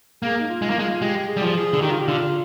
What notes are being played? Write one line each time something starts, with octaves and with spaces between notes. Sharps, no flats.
A#3 G#4
D#4
F4
G#3
A#3 D#4
G#3 F4
G#3 G4
G#4
G3
F3
G#4
D3
D#3 G4
F4
G4
D3 F4